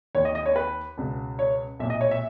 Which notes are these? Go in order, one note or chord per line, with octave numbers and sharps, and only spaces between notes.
D#2 D#3 C#5
D#5
D#5
C#5
B4
C#2 B2
C#5
B1 A#2 E5
D#5
C#5
E5